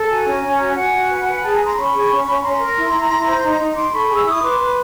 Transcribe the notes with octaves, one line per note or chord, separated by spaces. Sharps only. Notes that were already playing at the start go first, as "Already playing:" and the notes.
Already playing: A4
F#4 G#5 A#5
C#4
C#4
F#4
F#4 F#5 G#5
F#4
B4
B4
G#4 G5 A5
G#5 A#5
G#4
A#5 C6
C#4 B5 C#6
G#4
C#4
C#4
C#4 A#5 C6
A#4
E4
E4
E4
C5
D#4
D#4
D#4 C6 D6
A4 B5 C#6
G#4
E6
E4 D#6
B4 C6 D6
B4